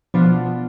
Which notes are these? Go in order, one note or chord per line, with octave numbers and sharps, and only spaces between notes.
B2 F3 B3 D4 F4